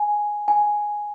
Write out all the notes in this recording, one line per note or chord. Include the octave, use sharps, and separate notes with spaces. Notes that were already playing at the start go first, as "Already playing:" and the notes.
Already playing: G#5
G#5